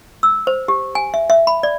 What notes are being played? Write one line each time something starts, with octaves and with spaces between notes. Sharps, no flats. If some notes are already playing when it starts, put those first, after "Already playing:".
E6
C5
G4
G#5
E5
E5
B5
D5